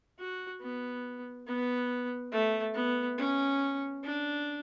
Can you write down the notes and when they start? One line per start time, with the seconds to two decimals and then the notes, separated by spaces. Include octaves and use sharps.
0.18 F#4
0.61 B3
1.47 B3
2.32 A3
2.75 B3
3.18 C#4
4.03 D4